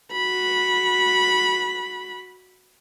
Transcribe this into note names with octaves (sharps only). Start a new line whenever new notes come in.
F#4 B5